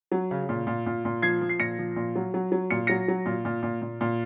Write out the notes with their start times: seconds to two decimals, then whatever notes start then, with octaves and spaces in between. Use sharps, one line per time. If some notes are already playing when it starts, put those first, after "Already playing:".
0.12 F#3
0.31 C#3
0.49 A#2
0.67 A#2
0.86 A#2
1.05 A#2
1.22 F3 G#6 C7
1.41 F3
1.49 C7
1.59 A#2 A#6 C#7
1.79 F3
1.96 A#2
2.16 F#3
2.34 F#3
2.52 F#3
2.70 A#2 C#7
2.87 F#3 A#6 C#7
3.08 F#3
3.26 A#2
3.45 A#2
3.63 A#2
3.82 A#2
4.01 A#2